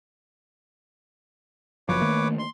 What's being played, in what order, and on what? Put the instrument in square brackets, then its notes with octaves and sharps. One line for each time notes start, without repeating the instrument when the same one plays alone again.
[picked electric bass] F#1 F#2 F3 [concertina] B4 C#5 D6
[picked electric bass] D#3 A3 A#3
[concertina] C6